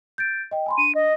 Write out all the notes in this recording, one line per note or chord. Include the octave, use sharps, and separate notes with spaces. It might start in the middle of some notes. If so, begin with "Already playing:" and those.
G6 A6 D7
D#5 G5
G#5 B5 C6
D4 D#7
D#5